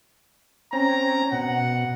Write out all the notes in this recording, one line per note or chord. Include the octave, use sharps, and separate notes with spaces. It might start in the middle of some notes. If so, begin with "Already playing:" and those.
C4 C#4 A#5
B2 F#5